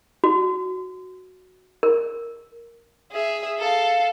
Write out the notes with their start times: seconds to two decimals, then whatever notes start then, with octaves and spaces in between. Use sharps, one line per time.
0.24 F#4
1.83 A#4
3.12 G#4 E5
3.59 A4 F5